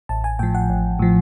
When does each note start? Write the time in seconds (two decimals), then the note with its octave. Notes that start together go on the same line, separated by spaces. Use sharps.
0.09 A1 A5
0.24 G#5
0.39 A2 F3 G5
0.55 F#5
0.69 A1
0.99 A2 F3